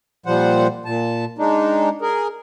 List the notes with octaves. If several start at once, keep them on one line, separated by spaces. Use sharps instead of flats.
A#2 F3 G3 C5 F#5
A#2 A5
G#3 D4 D#4
G#4 A#4